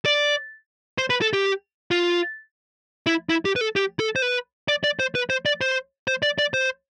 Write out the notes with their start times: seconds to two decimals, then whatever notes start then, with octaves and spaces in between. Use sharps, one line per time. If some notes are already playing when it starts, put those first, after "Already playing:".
0.05 D5
0.98 C5
1.10 B4
1.22 A4
1.33 G4
1.91 F4
3.07 E4
3.29 E4
3.45 G4
3.56 B4
3.61 A4
3.76 G4
3.99 A4
4.16 C5
4.22 B4
4.68 D5
4.84 D5
5.00 C5
5.15 B4
5.30 C5
5.46 D5
5.61 C5
6.08 C5
6.23 D5
6.38 D5
6.54 C5